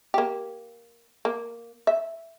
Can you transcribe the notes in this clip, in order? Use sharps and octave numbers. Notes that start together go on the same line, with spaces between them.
A#3 G4
A#3
E5